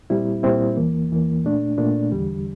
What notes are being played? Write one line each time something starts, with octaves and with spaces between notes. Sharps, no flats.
A#2 G3 C4 E4
A#2 G3 C4 E4
E2 E3 A#3
E2 E3 A#3
A#2 A3 D4
A#2 A3 D4
E2 D3 G3